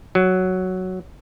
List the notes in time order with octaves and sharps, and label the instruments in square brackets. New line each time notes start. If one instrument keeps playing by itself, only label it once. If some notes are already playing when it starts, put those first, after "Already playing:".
[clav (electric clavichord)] F#3